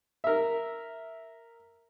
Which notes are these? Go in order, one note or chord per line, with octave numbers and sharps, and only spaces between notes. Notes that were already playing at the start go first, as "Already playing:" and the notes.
A#4 E5